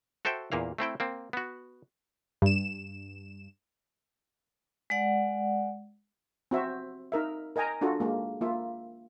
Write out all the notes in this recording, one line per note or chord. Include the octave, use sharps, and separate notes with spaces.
F#4 A4 C5 E5 G5
E2 A#2 A#3 F5
A3 C4 E4 G5
A#3 C4
B3 F#4
G2 E7
G#3 D5 F#5
C4 F#4 E5
D#4 A#4 E5
A#4 D#5 G5 G#5 A#5
D4 F4 F#4 A4
G#3 A#3
A#3 F4 E5